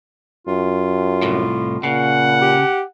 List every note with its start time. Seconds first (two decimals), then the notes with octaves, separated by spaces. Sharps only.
0.47 F#2 F4
1.22 C2 A2
1.83 A#2 C#3 F#5
2.42 G4